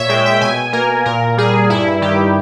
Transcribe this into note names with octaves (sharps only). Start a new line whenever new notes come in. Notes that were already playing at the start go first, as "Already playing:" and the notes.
Already playing: A#2 C#5 E5
G#3 G5
G5
B2 G#5
A#3 A#4
A#2 A#4
G3 G#4
G2 E4
D#3 G4